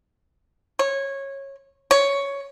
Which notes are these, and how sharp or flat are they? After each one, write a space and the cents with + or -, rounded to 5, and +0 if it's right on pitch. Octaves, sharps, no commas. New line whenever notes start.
C#5 -15
C#5 +10